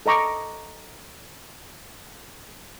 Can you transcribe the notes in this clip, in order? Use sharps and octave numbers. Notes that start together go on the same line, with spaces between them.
A4 D#5 A#5 C#6 D6